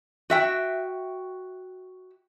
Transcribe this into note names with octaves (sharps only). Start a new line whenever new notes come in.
F#4 E5 G5